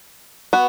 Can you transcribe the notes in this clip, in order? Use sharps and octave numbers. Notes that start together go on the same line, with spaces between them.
B3 F#4